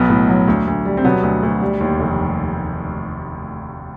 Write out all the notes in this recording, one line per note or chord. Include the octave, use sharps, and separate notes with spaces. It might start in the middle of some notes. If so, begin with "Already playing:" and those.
Already playing: B1 B2 B3
A2
F#3
D2
D2
G3
C4
B2 F#3 B3
D2
D2
G3
D#2
F1